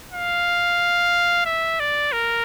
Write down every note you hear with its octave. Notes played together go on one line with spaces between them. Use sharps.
F5
E5
D5
A#4